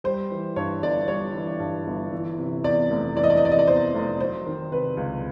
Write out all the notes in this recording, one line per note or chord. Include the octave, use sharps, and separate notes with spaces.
G3 C5
E3
G2 C#5
G1 D5
G3 C#5
E3
G2
G1
E3
C3
E2 D5
F1
E3 D5
D#5
D5
D#5
C3 D5
D#5
D5
E2 C5
F1
F#3 C5
D#3
C3 B4
C#2